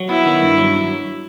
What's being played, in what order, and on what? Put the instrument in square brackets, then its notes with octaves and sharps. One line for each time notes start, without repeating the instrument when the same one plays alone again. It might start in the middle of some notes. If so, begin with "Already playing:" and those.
Already playing: [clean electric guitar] F#3
[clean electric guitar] B3 [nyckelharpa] E4
[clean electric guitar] D#3
G2
F#3